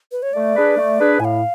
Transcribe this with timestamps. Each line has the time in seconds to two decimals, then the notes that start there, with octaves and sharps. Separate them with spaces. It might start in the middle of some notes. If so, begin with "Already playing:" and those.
0.12 B4
0.22 C#5
0.33 A3 D5
0.55 D4 G#4 B4
0.77 A3
0.98 D4 G#4 B4
1.20 A2 G#5
1.25 F5